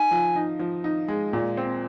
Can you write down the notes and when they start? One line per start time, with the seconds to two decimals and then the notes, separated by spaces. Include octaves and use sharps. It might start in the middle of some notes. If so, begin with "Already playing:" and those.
Already playing: D#4 G#5
0.11 F3
0.35 D#4
0.60 F3
0.84 D#4
1.08 G#3
1.33 A#2
1.57 C4